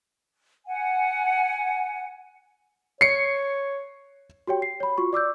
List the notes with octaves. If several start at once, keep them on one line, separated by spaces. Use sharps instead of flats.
F#5 G#5
C#5 C7 C#7
F#4 G4 C#5 G5
C7
C#5 B5
F4 F#4 C#6
D5 D6 E6 G6